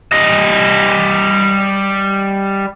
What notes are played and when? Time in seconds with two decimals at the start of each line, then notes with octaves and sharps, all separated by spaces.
0.12 G3 D#5